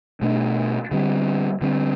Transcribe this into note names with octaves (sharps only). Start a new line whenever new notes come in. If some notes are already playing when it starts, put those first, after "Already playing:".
B2 A3 D4
D3 G3 C4
D3 G3 C4